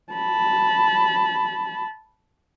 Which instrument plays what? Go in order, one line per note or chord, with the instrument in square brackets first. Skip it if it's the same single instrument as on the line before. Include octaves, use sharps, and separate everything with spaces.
[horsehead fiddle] A5 B5